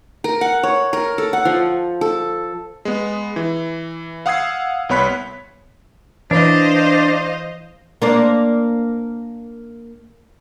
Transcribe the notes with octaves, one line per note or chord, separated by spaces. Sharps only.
A#4
F#5
C#5
A#4
A4
F#5
F3
A4
G#3 B3
E3
F5 F#5 D#6 E6 G#6 C7
C2 B3 C#5 B5 F#6 B6
E3 D4 C5 C#5 D#5 F5
A#3 D4 C5